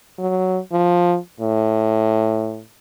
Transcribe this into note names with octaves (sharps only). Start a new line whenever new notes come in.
F#3
F3
A2